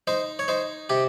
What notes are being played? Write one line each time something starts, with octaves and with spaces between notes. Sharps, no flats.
D#4 C5
C#5
D#4 C5
C3 G4